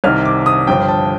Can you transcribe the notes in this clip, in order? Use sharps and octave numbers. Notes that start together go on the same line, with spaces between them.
C2 C3 D#3 F6
D6
D#6
G1 G2 D3 F3 G5
A5